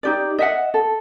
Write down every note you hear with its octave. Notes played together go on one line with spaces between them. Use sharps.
D#4 G4 D5
D#5 E5 F#5
A4